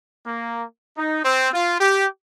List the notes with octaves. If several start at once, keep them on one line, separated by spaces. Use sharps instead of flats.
A#3
D#4
C4
F4
G4